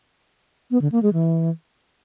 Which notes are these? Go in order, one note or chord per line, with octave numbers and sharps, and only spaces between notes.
B3
D3
A#3
G#3
E3